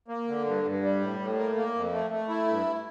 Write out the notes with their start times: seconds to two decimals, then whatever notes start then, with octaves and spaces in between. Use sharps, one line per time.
0.08 A#3
0.28 D3
0.45 G2
0.64 G2
0.82 G3
1.00 A2
1.19 A2
1.38 A#3
1.55 A#3
1.75 F2
1.92 A3
2.11 A3
2.29 E4
2.48 G2